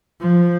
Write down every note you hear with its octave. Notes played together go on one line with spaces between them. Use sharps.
F3